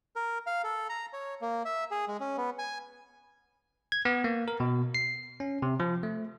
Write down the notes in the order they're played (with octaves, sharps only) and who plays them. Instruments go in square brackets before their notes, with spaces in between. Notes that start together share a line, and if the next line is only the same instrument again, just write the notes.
[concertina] A#4
F5
A4
A#5
C#5
A#3
E5
G#4
G#3
C#4
B3
G#5
[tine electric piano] G#6
B3
A#3
A#4
B2
C7
C#4
C3
F3
A3